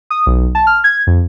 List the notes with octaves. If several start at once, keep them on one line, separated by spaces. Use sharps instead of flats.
D#6
B1
A5
F6
G#6
F2